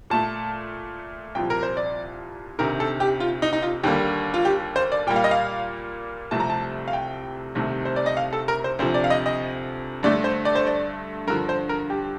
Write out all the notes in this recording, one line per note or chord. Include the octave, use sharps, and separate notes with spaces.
A#2 A3 A5
C2 A#2 F3 G5
A#4
C5
D5
D2 C3 D#3 A#4
A4
G4
F4
D#4
D#4
F4
D#2 D3 G3 A#3 G4
F4
G4
C5
D5
A#2 G3 A#3 G5
F5
D#5
F5
C2 C3 F3 A3 A5
A#5
A5
F5
G5
C2 C3 D#3 A3
C5
D5
D#5
F5
A4
A#4
C5
D2 C3 F3 C5
D5
F5
D#5
D#5
G2 D3 A3 D5
C5
D5
C5
D5
G2 D3 F3 A#4
C5
A#4
G4